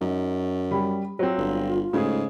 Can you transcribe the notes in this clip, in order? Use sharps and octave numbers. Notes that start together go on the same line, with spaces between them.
F#2 D#4
G3 B5
F#3 C4 F4 C5
G1
G#2 C#3 A3 G#4